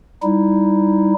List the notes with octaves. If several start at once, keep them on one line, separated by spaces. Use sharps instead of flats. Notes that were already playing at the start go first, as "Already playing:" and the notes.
G3 D#4 E4